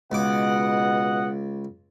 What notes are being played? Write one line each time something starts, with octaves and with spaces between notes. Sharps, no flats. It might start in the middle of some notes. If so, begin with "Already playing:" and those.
C#2 B2 D#5 F#5 D6